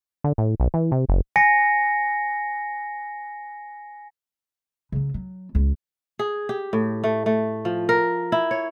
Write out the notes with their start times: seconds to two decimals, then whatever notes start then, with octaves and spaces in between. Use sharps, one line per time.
0.24 D3
0.38 A2
0.60 B1
0.74 E3
0.92 C3
1.09 F#1
1.36 G#5 A#6 C#7
4.92 C#3 F#3
5.14 F#3
5.55 C#2 E4
6.19 G#4
6.49 G4
6.73 A2
7.04 A3
7.26 A3
7.65 F3
7.89 A#4
8.32 E4
8.51 C#5